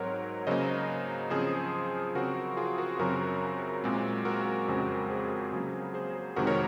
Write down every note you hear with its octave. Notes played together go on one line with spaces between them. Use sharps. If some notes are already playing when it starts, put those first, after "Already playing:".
Already playing: G#2 F#3 C4 A#4 C#5
C#3 F#3 A#3 C5 D#5
C#3 F3 C4 G#4 C5
C#3 F#3 C4 F#4 A#4
F4 G#4
F#4 A#4
F#2 C#3 F#3 C4 F#4 A#4
A#2 G#3 C4
F#4 A#4
F2 C#3 G#3 C4
G#4 C5
C#3 F#3 A#3
G#4 C5
F2 C3 D#3 G#3 F#4 A#4
A#4 C#5